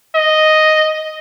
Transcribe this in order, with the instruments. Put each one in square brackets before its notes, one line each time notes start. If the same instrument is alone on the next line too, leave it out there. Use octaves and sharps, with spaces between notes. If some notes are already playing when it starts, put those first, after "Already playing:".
[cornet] D#5